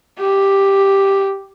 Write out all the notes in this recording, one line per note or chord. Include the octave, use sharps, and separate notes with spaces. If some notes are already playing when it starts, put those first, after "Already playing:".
G4